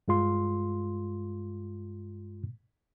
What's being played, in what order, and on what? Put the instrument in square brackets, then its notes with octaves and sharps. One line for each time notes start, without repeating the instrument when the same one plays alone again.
[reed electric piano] G2 G#3 F4 C6